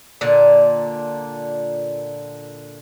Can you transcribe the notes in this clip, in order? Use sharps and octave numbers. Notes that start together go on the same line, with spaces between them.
A#2 D3 D5